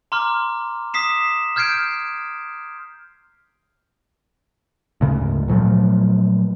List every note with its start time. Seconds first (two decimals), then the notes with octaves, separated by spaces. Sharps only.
0.12 A#5 C6 D6 F6
0.94 D#6 B6 C7 E7
1.56 F6 G6 G#6 C7 D7
5.01 D2 G#2 C#3
5.48 A#2 F3 F#3 A3